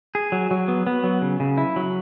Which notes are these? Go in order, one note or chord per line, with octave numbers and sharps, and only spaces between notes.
G#4
F#3
F#3
B3
B3
F#3
C#3
C#3
E4
F#3